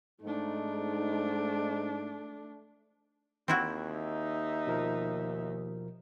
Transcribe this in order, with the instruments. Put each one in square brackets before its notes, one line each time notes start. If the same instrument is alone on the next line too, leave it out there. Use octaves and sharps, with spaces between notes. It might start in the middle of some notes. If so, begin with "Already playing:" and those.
[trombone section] G#2 D#4 [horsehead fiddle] A3 D4
[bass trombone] D#2 [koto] C4 E4 F#4
[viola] D#4 E5
[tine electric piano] B2 F3 A#4